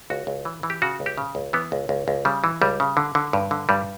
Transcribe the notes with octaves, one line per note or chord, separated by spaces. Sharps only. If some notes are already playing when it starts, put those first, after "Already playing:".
C#2 F#4
C#2
E3
E3
G4
C#3 F#4
C#2
G4
C#3
C#2
E3 B3
C#2
C#2
C#2
C#3 G3
E3
C#2 G3
C#3
D3
D3
G2
D3
G2 G3